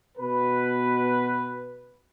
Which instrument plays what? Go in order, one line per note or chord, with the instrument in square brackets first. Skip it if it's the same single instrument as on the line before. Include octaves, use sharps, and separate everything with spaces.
[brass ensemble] B2 B4